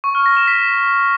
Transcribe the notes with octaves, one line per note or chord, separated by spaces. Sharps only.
C#6
F6
A#6
E7
B6